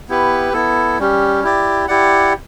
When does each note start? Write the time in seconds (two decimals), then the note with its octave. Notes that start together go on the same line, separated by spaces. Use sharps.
0.09 B3 E4 G4 B4
0.53 B3 E4 A4
0.99 G3 C#4 G4
1.44 E4 G4 D5
1.88 E4 G4 D5 F#5